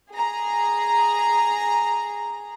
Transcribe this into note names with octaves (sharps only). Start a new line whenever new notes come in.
G#4 A#5